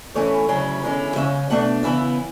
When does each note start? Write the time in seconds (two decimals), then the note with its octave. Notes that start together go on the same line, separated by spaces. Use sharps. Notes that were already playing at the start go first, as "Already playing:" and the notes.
0.14 A2 E3 A3 C#4 E4 C#5
0.48 D2 C#3 F#3 C#4 E4
0.82 E2 D3 G#3 C#4 E4
1.16 C#3 G#3 C#4 E5
1.50 B2 A3 D4 F#5
1.83 C#3 E3 B3 E4 E5